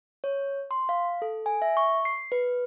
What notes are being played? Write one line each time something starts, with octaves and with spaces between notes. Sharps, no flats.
C#5
C6
F5
A4
G#5
E5
C#6
C7
B4